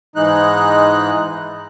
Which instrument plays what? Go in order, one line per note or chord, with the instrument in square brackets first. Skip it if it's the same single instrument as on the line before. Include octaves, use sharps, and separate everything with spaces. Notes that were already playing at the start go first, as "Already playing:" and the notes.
[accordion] G#2 E3 G#3 D#4 F#6